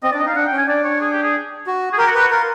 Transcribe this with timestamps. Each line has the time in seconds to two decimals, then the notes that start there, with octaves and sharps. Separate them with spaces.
0.03 C4 D#5
0.11 D4 D5
0.19 D#5
0.25 D#4 F5
0.35 D4 F#5
0.47 G5
0.52 C#4
0.58 G#5
0.68 D4 D5
0.84 C#5
1.01 G#4
1.12 G4
1.22 G#4
1.66 F#4
1.93 G#4
1.98 G4 A#4
2.07 F#4
2.15 G4 B4
2.23 F#4
2.30 F4 A#4